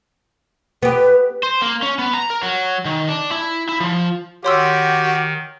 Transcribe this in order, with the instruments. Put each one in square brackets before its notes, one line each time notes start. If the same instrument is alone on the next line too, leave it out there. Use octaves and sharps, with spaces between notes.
[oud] B3 G4 [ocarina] B4
[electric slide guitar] C5
A#3
C#4
B3
A#5
A#4
F#3
D#3
D4
E4
E4
F3
[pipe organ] D#3 [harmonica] F#4 G4 [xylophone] C#5 C6 E6